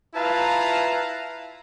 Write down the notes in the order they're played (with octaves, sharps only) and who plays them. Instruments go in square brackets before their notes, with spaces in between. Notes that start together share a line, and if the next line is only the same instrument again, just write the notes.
[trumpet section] E4 F4 B4 F5 A5 A#5